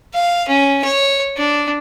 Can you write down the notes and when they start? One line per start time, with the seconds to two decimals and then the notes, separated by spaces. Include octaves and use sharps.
0.14 F5
0.48 C#4
0.84 C#5
1.37 D4